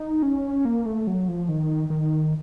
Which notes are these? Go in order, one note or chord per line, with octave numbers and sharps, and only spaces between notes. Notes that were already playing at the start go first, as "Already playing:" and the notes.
Already playing: D#4
C#4
A#3
A3
F#3
F3
D#3
D#3